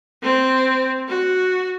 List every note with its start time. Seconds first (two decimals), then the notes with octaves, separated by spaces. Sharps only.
0.23 C4
1.09 F#4